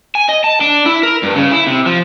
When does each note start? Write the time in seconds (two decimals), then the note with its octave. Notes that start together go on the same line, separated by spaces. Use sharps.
0.15 G#5
0.29 D#5
0.44 A5
0.61 D4
0.86 E4
1.03 A#4
1.23 G2
1.35 C#3
1.51 E4
1.67 C3
1.86 F3